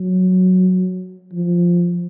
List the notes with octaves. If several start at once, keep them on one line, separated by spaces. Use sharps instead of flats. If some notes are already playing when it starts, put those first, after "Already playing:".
Already playing: F#3
F3